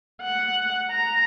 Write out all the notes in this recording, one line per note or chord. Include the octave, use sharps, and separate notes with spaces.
F#5
A#5